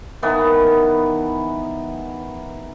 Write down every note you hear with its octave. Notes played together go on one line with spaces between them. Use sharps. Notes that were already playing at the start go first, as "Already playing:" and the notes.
D#3 E3 B3